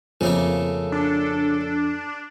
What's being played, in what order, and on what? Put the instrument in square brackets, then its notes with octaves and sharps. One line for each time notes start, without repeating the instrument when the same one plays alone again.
[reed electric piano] F2 F3 [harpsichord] C#3 A3 A#3 [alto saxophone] A4
[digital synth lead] D4